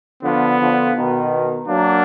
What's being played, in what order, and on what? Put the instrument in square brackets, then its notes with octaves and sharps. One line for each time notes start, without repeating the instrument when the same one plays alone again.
[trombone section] D3 F3 [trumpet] B3
[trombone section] D3 F3
B2 D#3
[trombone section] F#3 A#3 [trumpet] D4